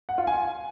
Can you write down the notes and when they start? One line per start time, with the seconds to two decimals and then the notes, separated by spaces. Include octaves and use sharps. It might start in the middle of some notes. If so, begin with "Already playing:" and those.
0.09 F#5
0.18 F4
0.27 G#5